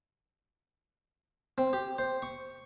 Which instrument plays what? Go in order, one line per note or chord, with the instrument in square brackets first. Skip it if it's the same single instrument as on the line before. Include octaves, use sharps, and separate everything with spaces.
[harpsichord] C4
G4
C5
C#6